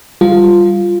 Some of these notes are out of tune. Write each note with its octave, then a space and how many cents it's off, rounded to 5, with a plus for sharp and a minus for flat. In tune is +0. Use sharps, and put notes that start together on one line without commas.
G3 +0 F4 +0